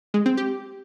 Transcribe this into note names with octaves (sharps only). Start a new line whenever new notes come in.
G#3
C4
G4